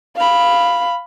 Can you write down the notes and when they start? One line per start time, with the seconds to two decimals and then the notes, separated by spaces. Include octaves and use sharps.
0.17 F5 B5